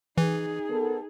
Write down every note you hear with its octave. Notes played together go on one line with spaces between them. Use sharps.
E3 D#4 G#4
B3 A4 A#4